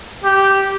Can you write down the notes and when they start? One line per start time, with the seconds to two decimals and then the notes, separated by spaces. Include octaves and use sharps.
0.25 G4